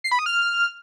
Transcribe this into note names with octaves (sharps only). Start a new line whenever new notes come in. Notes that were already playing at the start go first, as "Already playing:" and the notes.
C7
B5
D#6
F6